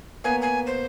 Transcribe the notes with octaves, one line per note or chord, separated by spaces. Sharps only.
A#3 B3 C#5 G#5
G#5
C5